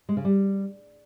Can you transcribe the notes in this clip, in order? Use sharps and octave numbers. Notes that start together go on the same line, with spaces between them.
G#3
C#3
G3